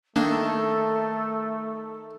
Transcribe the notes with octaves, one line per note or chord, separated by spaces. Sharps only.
D#3 A3 A#3 D4 A4